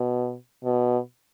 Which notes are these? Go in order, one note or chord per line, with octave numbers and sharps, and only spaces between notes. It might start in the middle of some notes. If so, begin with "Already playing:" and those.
Already playing: B2
B2